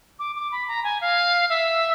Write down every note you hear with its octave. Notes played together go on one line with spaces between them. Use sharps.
D6
D6
B5
A#5
G#5
F5
E5